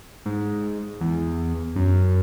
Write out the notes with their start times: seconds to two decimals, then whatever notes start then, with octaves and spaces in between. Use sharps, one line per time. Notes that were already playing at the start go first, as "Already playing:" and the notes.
0.26 G#2
1.01 E2
1.76 F#2